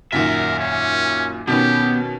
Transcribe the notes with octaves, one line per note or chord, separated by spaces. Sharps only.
F#2 A#2 D#3 A#4 E5 F#5
C#4
B2 D#3 B3 C#4 G4